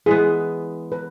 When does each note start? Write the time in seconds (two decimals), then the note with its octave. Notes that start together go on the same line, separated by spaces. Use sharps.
0.06 E3 G#3 B3 G#4
0.92 B4